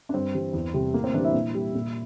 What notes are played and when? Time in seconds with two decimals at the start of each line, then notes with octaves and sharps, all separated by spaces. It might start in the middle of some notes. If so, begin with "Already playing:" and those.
0.09 D4
0.14 G2 C4
0.34 E3 G3
0.53 E2
0.74 C3 G3
0.94 A2 A#3
1.04 C4
1.14 E3 G3 D4
1.24 E4
1.34 A#2
1.55 G3
1.75 A#2